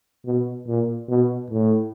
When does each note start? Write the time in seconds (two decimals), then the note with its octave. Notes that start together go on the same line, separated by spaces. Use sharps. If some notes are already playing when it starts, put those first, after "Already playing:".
0.26 B2
0.67 A#2
1.09 B2
1.51 A2